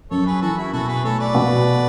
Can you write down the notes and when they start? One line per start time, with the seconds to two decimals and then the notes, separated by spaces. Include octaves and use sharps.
0.11 F#2 A4 C#5
0.26 G#4 B4
0.42 E3 F#4 A4
0.57 E4 G#4
0.73 B2 F#4 A4
0.88 G#4 B4
1.04 A3 A4 C#5
1.20 B4 D5
1.35 B2